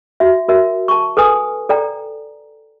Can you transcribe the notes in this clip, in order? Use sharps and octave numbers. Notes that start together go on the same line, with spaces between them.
F#4 E5
F#4 A#4 E5
A5 C#6
A4 B4 G#5 D#6
A4 D5 G5 A#5